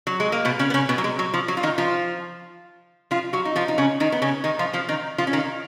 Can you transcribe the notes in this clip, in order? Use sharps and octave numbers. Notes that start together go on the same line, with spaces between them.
F#3
G#3
A#3
B2 B3
C#3 C#4
B3
C#3 C#4
B2 B3
F#3
G#3
F#3
F3
F#3
F4
D#3 D#4
F3 F4
F3 F4
F#3 F#4
D#4
F3 F4
D#4
C#3 C#4
D#3 D#4
B3
C#3 C#4
D#3 D#4
F3 F4
F3 F4
D#3 D#4
F3 F4
C#4
D#3 D#4